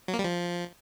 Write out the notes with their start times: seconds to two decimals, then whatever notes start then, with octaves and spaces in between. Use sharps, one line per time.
0.08 F#3
0.14 A#3
0.19 G3
0.24 F3